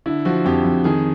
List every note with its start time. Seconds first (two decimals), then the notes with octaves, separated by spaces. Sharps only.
0.06 D3 E4
0.25 F3 F#4
0.45 F2 G4
0.64 F2
0.84 D#3 G#4